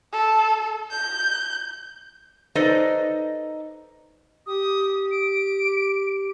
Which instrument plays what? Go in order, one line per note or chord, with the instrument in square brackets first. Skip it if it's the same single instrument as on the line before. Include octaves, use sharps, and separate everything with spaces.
[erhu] A4
G6
[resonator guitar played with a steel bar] D#4 A4 B4 C5 D5 D#5
[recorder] G4 [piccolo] D#6
[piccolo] D7